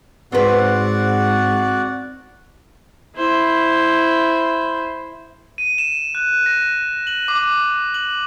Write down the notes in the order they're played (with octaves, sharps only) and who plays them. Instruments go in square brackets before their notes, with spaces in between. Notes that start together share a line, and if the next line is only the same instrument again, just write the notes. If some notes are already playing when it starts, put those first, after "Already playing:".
[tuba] G#2 [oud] C4 B4 [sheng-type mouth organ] F#4 D5 F#5
[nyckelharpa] E4 C5
[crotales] D#7
E7
F#6
A#6
F#7
D6
F#7